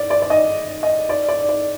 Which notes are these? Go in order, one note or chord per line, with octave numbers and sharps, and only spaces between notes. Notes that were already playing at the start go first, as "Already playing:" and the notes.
Already playing: D5
D5
D5
D#5
D#5
D5
D5
D5